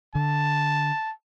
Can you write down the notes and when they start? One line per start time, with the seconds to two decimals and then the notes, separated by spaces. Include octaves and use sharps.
0.15 D3 A5